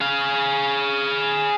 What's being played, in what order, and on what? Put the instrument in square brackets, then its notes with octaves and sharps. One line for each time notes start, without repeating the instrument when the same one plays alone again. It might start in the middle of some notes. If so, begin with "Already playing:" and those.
[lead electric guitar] G#4 F5